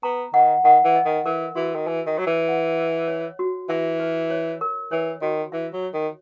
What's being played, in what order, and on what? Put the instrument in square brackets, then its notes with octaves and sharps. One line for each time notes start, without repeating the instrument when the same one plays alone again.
[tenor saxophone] B3 [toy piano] A#5
[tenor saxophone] D#3 [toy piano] F#5
[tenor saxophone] D#3 [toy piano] F#5
[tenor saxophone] E3
[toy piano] D#5
[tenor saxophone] D#3
[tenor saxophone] E3 [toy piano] A#4
[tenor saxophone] E3 [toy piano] F#4
[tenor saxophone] D#3
[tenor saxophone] E3 [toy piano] G#5
[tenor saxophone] D#3
[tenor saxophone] F#3 [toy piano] C#5
[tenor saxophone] E3
[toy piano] F#5
D#5
C#5
F#4
[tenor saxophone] E3 [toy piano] E5
[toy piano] B4
C#5
A#4
[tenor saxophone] E3 [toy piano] C#5
[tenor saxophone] D#3 [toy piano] F#4
[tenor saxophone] E3 [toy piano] E5
[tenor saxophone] F#3
[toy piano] C#5
[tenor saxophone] D#3